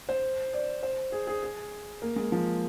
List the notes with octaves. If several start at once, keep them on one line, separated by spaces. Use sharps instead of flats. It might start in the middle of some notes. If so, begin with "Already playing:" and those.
C5
D5
C5
G#4
G#4
G#4
A#3
G#3
F3